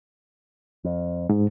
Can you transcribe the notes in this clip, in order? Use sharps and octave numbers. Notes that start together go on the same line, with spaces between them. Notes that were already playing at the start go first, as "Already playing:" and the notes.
F2
G#2